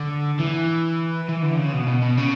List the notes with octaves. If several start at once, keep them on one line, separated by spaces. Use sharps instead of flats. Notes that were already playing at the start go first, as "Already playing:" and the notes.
Already playing: D3
E3
E3
D3
C#3
B2
B2
B2
C#3